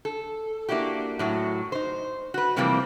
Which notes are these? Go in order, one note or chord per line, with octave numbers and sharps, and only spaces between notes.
A4
A#3 D4 E4 F#4 G4
A2 F#3 F#4
D#4 C5
F#4 B4
C3 E3 F3 G3 A#3 C4